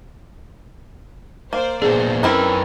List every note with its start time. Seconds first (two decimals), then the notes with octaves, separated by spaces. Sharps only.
1.53 A#3 C5 D5
1.82 A#2 B3 D4 G#4 C5
2.23 F#2 C4 C#4 D#4 E4 A#4 B4